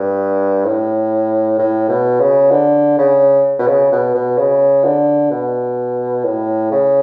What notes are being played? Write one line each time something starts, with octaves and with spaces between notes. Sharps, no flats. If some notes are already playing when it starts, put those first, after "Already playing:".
Already playing: G2
A2
A2
B2
C#3
D3
C#3
B2
C#3
B2
B2
C#3
D3
B2
A2
C#3